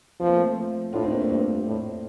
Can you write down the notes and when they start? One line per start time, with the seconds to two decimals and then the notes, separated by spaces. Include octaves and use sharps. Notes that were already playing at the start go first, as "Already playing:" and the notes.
0.20 F3 C4
0.28 A#3
0.35 A3 C4
0.93 A2 D4 F4
1.03 C4 D#4
1.11 A#3 D4
1.20 A3 C4
1.29 G2 A#3 D4
1.66 A2